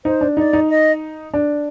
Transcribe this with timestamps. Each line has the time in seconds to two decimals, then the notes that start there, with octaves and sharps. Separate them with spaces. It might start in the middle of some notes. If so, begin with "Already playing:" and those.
0.05 D#4 C5
0.21 D4
0.37 D#4 D5
0.53 D#4
0.70 D#5
1.34 D4